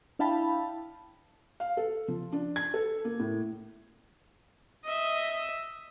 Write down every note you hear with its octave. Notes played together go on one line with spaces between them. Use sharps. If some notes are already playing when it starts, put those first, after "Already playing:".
D4 E4 F5 G5 A5 B5
F5
A4
F3
D4
G#6
A4
A#3
A2
D#5 E5